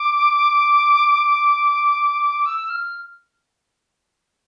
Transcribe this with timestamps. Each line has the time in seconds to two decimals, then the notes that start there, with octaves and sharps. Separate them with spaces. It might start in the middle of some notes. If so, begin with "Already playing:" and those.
Already playing: D6
2.46 E6
2.70 F6